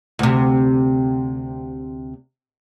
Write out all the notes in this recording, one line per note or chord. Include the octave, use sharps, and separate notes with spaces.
D2 C3